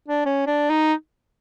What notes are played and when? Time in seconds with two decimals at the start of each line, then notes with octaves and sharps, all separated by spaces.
0.08 D4
0.25 C#4
0.47 D4
0.70 D#4